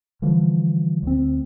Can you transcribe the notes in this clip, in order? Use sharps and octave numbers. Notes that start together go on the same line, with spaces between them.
D3 E3 F3 G3
D2 C4